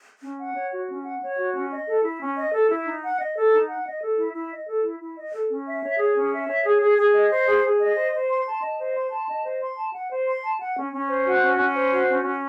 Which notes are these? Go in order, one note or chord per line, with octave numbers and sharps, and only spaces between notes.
C#4
F#5
C#5
F#4
C#4
F#5
C#5
F#4
C#4
D#5
A4
E4
C#4
D#5
A4
E4
D#4
F#5
D#5
A4
D#4
F#5
D#5
A4
E4
E4
D#5
A4
E4
E4
D#5
A4
C#4
E5
C#5
G#4
C#4
E5
C#5
G#4
G#4
G#4
D#5
C5
G#4
G#4
D#5
C5
C5
C6
A5
D#5
C5
C6
A5
D#5
C5
C6
A5
F#5
C5
C6
A5
F#5
C#4
C#4
C5
F#4
C#4
C#4
C5
F#4
C#4
C#4